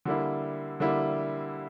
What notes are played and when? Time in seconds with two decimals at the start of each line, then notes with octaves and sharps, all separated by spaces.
0.05 D3 G3 A#3 E4
0.80 D3 G3 A#3 E4